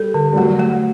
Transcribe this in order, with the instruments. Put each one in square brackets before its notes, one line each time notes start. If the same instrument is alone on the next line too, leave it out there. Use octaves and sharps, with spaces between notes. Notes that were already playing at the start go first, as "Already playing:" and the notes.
Already playing: [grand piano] G3 [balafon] A4
[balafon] D3
[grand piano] G3
[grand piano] F#3 [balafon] A3
[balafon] A3